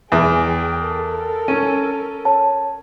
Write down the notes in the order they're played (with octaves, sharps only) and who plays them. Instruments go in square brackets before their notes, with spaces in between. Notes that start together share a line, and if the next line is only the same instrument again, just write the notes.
[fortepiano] E2 [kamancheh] G#4 G5
[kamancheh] A4 A#4
[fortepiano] C#4 [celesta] D#7
[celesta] C#5 A5